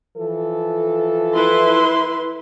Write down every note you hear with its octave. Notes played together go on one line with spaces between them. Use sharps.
E3 F3 A4
E4 B4 C6